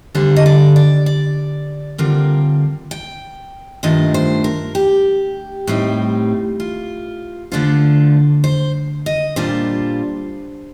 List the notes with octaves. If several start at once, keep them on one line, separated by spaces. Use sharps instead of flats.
D2 D3 G3 C5
D#5
D5
D5
D5
D3 G3 C4 F4 A#4
G5
G2 D#3 A3 D4 F4 D#5
C5
A#4
G4
A2 G3 C4 D#4
F4
D3 A3 D4 F4 C5
C5
D#5
A#2 G3 D4 F4 C5